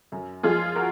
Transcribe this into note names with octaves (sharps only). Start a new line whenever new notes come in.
F#2
F3 G#3 F4 G#4
F#4 A#4